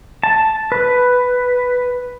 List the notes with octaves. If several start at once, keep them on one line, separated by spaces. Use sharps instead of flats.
A5
B4